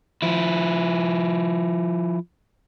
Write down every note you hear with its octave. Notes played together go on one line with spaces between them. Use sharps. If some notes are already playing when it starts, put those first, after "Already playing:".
F3 E4